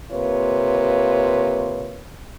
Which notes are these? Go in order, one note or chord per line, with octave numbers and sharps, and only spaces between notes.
C3 A#3 F4 B4 C#5